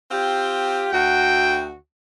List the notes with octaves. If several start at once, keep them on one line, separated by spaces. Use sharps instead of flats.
C4 F4 G4
D2 F#4 G5